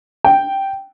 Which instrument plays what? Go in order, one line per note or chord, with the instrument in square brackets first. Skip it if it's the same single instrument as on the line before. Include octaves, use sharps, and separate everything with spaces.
[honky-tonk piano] G5